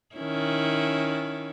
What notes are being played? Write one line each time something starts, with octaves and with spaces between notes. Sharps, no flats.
D#3 C#4 E4